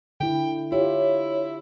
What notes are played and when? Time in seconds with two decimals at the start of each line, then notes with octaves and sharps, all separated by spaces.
0.20 D3 E4 G5
0.72 E4 F4 G4 C#5